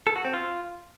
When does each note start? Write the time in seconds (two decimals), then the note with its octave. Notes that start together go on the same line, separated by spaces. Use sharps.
0.07 A4
0.16 F#4
0.25 C4
0.33 F4